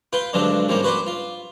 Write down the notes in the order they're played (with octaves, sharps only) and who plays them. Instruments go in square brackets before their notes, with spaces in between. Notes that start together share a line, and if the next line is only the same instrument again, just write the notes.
[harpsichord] F4 B4 G5
G2 D3 F3 F#3 G#3 D4
G#2 F3 G3 A#3 C#4
F#4 B4 C5 D5
F4